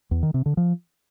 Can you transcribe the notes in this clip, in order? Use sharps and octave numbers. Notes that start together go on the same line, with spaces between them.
E2
D#3
C3
D3
F3